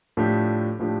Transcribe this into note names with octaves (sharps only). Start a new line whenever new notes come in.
A2 F3 A3 D4 G4
A2 F3 A3 D4 G4